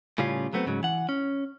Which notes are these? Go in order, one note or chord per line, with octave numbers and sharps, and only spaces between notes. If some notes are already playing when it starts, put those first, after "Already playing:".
A2 C#3 G3 C#4 F4
F#3 A3 B3 C4
G#2 C#3 F#3
E3 F#5
C#4